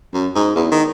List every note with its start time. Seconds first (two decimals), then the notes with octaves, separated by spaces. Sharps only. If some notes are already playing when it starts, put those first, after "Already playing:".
0.14 F#2
0.35 G#2
0.55 E2
0.72 D#3